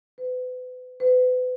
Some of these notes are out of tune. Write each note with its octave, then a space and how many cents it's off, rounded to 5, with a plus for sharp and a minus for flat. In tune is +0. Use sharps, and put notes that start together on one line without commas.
B4 +35
B4 +35